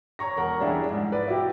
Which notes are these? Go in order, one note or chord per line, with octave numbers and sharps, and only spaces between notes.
C#5 A#5 C#6 A#6
E1 A#4 F#5
G3 D4 E4 G#4
G#2
B4 D5
E4 F#4 G4